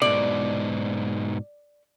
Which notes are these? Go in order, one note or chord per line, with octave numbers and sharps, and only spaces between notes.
G#2 B2 D5